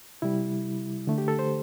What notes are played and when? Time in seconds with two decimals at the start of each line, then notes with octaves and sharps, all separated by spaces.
0.22 C3 G3 E4
1.07 D3 A3
1.18 G4
1.28 A4
1.39 C5